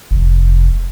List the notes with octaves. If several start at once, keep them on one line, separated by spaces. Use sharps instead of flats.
F1